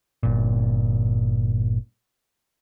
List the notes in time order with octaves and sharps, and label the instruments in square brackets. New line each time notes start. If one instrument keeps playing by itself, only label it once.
[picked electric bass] G1 A#2